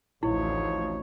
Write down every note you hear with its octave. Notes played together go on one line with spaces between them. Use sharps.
A1 D2 F3 D#4 E4 C#5